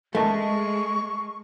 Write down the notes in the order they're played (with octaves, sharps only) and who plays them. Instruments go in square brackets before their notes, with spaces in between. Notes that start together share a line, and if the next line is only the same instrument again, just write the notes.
[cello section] G#3 [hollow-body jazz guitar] A3 [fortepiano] A#4 D#5 A5 [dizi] C#6